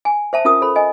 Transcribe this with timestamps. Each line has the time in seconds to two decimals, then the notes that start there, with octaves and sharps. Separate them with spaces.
0.05 G#5
0.33 C5 E5 A5
0.45 C#4 F4 A#4 D#6
0.62 A4 C5 B5
0.76 D#5 G#5